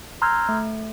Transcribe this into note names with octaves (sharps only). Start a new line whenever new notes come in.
A#5 C6 E6 F6 G6 G#6
A3